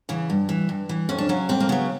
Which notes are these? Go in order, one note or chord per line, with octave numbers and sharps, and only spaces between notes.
C#3 E3
G2
E3
G2
E3
F2 C#4
D4
C#3 F#3 C#4
F2 C4
A#3
C#3 F#3 B3